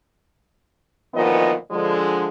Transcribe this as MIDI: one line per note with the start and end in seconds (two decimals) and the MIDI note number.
1.14 1.54 38
1.14 1.54 46
1.14 1.54 51
1.14 1.54 53
1.14 1.54 59
1.14 1.54 75
1.71 2.28 50
1.71 2.28 53
1.71 2.28 56